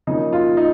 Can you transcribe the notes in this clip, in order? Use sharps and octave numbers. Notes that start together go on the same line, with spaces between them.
C#3 F3 A#3 D#4
F4
D#4